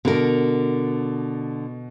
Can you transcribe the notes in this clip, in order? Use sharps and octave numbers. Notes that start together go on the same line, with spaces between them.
B2 D3 A#4